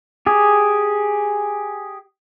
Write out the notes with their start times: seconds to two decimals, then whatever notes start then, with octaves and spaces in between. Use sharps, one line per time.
0.26 G4 G#4